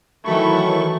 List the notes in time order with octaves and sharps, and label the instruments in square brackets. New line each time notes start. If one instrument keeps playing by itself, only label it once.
[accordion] D#3 C#6 [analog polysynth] E3 F#3 B5 [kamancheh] A3